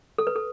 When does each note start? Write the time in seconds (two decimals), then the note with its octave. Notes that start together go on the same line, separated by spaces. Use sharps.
0.18 A4
0.27 B4
0.36 A4